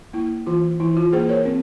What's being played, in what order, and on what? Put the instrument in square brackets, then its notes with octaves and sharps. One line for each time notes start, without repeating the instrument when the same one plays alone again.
[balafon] A#3 E4
E3 F4
E3 E4
F4
A#3 G#4 C5
A#4 C#5
C4